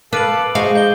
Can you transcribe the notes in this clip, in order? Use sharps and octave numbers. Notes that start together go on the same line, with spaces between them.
A4 B4 F5 A5 D6 D7 F#7
G#3 C5 D#5 F5 C#6
D#4 C5 G6 G7